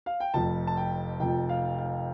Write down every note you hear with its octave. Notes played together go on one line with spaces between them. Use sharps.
F5
G5
F1 F2 F3 A5
A5
G5
F1 F2 F3 G5
F5
F5